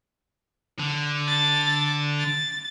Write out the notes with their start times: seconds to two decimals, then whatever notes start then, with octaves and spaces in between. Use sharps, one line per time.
0.80 D3
1.28 A6
2.19 A6